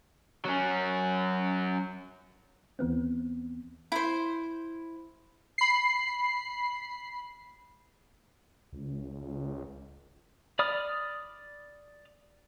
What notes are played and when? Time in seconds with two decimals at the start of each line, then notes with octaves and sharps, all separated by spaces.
0.45 F#3 C#4
2.79 D#2 E3 B3 C4
3.92 E4 C5
5.58 B5 C7
8.73 C#2
10.59 D5 B5 D#6 F6